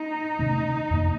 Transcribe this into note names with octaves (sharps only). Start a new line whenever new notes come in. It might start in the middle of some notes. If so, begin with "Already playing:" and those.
Already playing: D#4
C3 D#3 A3 C#4
F2 C3 D#3 A#3